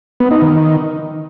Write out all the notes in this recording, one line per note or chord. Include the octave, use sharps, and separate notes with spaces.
B3
D#4
D#3